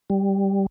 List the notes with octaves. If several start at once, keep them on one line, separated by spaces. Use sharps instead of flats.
G3